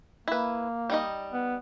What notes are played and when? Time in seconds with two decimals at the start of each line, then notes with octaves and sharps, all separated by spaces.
0.28 A#3 E4 B4
0.90 G3 D#4 D#5
1.32 B3